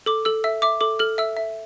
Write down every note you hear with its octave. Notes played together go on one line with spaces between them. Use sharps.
A4 D6
A4 E6
E5 E6
E5 D6
A4 D6
A4 F6
E5 E6
E5